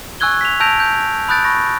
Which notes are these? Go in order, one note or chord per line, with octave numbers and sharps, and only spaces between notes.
G#5 C#6 E6 F#6 G#6 G7
B6 F7
A5 E6 G6 A#6 D7 F7
G6
B5 D#6 F#6 G6 A6 D7
B5 C#6 A#6